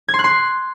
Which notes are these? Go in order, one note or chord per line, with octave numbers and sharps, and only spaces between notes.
G#6
C6
F#6
C6